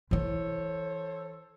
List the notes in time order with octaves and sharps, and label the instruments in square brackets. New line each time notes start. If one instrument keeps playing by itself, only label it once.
[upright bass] E3 E4 [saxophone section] A4 C5 C#5